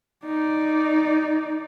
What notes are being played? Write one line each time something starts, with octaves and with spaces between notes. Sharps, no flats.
D#4 D5